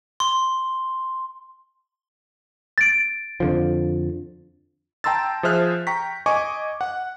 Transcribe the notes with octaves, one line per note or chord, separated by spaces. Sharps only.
C6
A6 D7
F2 D3 F3
G5 A5 A#5 C6 E6 A6
F3 G#4 C5 E5 F6 F#6
G5 A#5 C#6 B6
D#5 G#5 C#6 D6
F#5